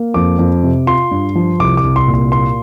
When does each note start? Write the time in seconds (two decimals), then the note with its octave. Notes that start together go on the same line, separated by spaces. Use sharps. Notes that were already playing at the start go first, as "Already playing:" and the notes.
Already playing: A#3
0.14 F2 D6
0.39 F2
0.63 C3
0.87 F4 C6
1.11 G2
1.35 F3
1.59 C2 D6
1.77 D6
1.84 C2
1.96 C6
2.08 A#2
2.14 C6
2.32 A#3 C6